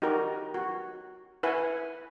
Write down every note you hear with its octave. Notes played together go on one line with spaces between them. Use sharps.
D#4 F#4 G4 A#4
F#4
E4 B4 F#5 G#5